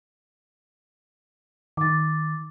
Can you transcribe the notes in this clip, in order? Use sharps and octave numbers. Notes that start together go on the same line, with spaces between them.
D#3 D6 A6